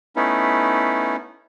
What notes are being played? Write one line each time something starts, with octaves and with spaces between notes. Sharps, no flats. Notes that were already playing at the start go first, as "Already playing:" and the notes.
A3 B3 C#4 D#4 E4